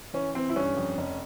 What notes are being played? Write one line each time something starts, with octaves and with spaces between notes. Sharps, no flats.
E3 C#4
E3 C4
E4
G2 C#4
F2
F1